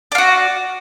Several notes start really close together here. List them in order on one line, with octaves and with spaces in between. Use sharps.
D5 F4 F#4